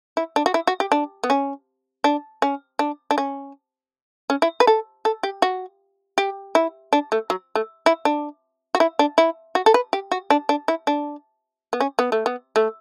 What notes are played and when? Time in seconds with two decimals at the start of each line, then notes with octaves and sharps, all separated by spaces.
0.17 E4
0.36 D4
0.46 F#4
0.54 E4
0.67 F#4
0.80 G4
0.92 D4
1.24 B3
1.30 C#4
2.04 D4
2.42 C#4
2.79 D4
3.11 D4
3.18 C#4
4.30 C#4
4.42 E4
4.60 B4
4.67 A4
5.05 A4
5.23 G4
5.42 F#4
6.18 G4
6.55 E4
6.93 D4
7.12 A3
7.30 F#3
7.56 A3
7.86 E4
8.05 D4
8.75 F#4
8.80 E4
8.99 D4
9.18 E4
9.55 F#4
9.66 A4
9.74 B4
9.93 G4
10.12 F#4
10.30 D4
10.49 D4
10.68 E4
10.87 D4
11.73 B3
11.80 C#4
11.99 B3
12.12 A3
12.26 B3
12.56 A3